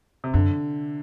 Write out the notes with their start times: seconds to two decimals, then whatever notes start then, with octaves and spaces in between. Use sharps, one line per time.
0.24 C3
0.34 F#2 D3